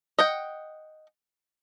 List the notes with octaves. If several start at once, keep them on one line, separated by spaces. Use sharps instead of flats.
D#5 F#5 G5